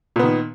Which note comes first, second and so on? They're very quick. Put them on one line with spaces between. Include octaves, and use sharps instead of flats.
A#2 B3 D#3